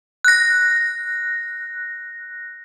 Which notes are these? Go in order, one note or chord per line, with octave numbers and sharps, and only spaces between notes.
F#6 A#6